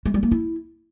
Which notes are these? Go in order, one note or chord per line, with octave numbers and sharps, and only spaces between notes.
G#3
G3
A#3
E4